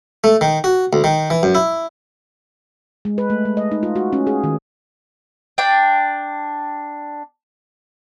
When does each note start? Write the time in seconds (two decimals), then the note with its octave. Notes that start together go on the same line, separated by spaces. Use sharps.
0.24 A3
0.41 D#3
0.64 F#4
0.93 D2
1.04 D#3
1.30 E3
1.43 F#2
1.55 E4
3.05 G#3
3.18 B4
3.30 A3
3.45 G#3
3.57 D#5
3.71 D#4
3.83 F4
3.96 F#4
4.13 C#4
4.27 G#4
4.44 D#3
5.58 D4 G5